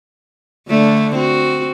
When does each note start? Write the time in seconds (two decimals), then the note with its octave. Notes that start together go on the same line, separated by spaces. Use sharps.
0.68 D3 A3 D4
1.15 C4 F#4